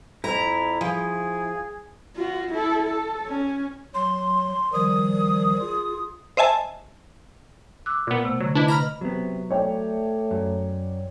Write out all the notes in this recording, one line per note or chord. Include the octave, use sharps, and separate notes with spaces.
F2 E4 A#5
F3 G#4
F4 F#4
E4 A4
A4
C#4
F#3 C6
D#3 F3 G3 D#6
F4 G#4
C5 D#5 E5 G#5 A5
D6 E6 F#6
A#2 B3
C3 A3
D3 F#3
D4 E4 B4 D#5
A#5 B5 F6
C3 F#3 B3
A3 C#5 D5 G5
F#2